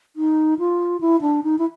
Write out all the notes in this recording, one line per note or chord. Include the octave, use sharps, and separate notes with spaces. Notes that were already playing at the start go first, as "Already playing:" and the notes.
D#4
F4
E4
D4
D#4
E4